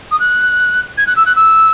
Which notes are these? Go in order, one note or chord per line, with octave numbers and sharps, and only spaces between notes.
D#6
F#6
G#6
F#6
E6
F#6
E6